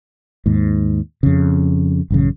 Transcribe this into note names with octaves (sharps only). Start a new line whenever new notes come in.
D#2 G#2
F2 C#3
A1 F#2 C#3